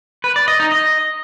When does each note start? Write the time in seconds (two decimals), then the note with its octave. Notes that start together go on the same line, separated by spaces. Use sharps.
0.24 B4
0.36 D5
0.48 D#5
0.60 D#4
0.72 D#5